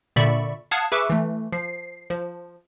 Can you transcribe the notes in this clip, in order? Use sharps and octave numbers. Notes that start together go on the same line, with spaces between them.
A#2 D3 D5 E5 B5 C#6
F5 F#5 A5 D#6 G#6
G#4 B4 E5 C#6 D6 E6
E3 A3
F3 C7
F3